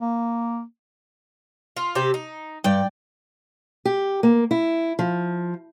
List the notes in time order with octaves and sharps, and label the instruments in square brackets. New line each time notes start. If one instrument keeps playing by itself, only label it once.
[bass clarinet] A#3
[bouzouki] F4
C3 G4
D#4
[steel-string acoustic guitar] G2 [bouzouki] D5 G5
[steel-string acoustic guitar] G4
A#3
E4
F3